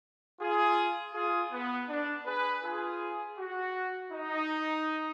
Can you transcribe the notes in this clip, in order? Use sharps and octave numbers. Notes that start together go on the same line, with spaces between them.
F4 G#4
F4 G#4
B3
D4
G#4 B4
F4 G#4
F#4
D#4